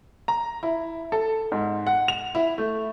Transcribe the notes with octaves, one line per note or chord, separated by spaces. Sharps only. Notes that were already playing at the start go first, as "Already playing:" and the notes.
A#5
E4
A4
G#2
F#5
F7
E4
A3